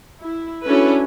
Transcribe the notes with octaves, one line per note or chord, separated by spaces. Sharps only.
E4
C#4 D4 E4 F#4 A4 B4